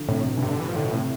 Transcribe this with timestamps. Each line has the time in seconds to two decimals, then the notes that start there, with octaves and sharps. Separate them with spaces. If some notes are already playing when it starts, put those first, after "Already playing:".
Already playing: D3 F3
0.08 A2 C3
0.26 B2
0.38 G2
0.42 A2 C3
0.50 D3
0.60 E3
0.68 F3
0.76 A2 D3
0.84 B2
0.93 A2 C3